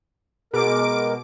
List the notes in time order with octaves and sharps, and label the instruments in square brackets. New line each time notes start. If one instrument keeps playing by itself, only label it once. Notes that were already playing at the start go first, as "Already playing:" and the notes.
[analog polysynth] B2 [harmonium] G#3 A#4 [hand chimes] G#4 [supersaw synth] D6 D7